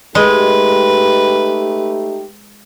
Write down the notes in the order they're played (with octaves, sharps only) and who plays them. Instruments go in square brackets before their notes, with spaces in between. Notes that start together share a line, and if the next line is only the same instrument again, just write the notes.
[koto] G#3 [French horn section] A3 D#4 G4 [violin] B4